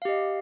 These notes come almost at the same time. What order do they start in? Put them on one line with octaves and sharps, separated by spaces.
F5 G4 D#5